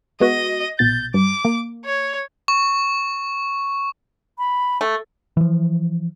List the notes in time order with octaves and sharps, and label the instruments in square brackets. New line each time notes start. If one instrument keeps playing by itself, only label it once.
[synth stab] G#3 B3 F#4 [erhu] D#5
[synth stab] A#1 B2 A6 [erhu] G6
[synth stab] G2 [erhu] D6
[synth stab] A#3
[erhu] C#5
[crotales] C#6
[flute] B5
[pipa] A3
[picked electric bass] E3 F3